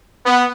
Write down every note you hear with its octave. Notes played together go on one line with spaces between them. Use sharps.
B3